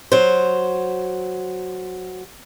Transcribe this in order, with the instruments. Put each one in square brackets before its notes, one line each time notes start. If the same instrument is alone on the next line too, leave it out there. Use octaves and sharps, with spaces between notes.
[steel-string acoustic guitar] F#3 C5